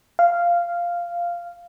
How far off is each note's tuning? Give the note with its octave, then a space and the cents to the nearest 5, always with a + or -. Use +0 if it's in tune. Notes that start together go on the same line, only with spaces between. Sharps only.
F5 -10